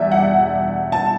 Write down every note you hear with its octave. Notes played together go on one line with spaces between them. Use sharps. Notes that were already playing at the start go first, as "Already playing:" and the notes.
Already playing: E2 B2 G3 D5 E5
F#5
A5